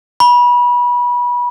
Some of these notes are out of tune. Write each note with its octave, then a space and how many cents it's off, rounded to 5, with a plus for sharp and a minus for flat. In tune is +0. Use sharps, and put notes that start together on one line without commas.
B5 -25